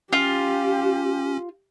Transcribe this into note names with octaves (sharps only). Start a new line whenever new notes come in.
C#4 F4 G4